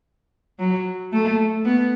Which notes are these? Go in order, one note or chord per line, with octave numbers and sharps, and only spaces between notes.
F#3
A3
B3